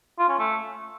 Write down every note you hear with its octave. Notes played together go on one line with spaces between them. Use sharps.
F4
C#4
A3